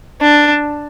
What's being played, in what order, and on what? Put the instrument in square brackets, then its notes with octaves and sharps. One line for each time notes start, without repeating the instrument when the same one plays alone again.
[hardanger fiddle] D4